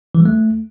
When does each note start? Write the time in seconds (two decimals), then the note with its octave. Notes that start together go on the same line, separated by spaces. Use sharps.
0.15 E3
0.20 G3
0.25 A3